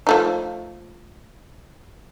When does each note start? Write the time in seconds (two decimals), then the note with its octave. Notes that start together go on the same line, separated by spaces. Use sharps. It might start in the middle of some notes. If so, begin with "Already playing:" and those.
0.07 F3 A3 D#4